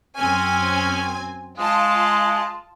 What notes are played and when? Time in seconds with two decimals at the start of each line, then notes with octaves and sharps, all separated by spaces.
0.17 F#2 C4 C#4 G#5
1.59 G#3 F4 A5